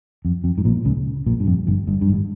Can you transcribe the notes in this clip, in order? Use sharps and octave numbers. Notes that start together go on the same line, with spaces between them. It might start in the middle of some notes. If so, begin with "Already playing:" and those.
F2
F2
G#2
A#1 A#2
C#2 C#3
A#1 A#2
G2
F2
G1 G2
G1 G2
G2
G#1 G#2